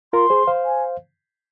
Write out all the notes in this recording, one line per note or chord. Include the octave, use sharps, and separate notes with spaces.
F4 A#4 C6
G#4 C5
C5 F5
G#5